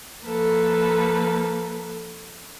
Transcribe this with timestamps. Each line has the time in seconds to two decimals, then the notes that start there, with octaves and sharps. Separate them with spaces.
0.25 F3 A#3 A4 B4